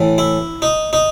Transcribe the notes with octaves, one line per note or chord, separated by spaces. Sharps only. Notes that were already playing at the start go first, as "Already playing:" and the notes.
Already playing: A2 E3
E4
D#4
D#4